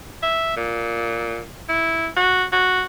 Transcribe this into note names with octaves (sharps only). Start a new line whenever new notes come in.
E5
A#2
E4
F#4
F#4